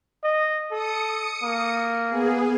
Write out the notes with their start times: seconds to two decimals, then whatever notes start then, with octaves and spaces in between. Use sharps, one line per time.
0.24 D#5
0.71 A4 D#6 C#7
1.43 A#3
2.07 B3 G#4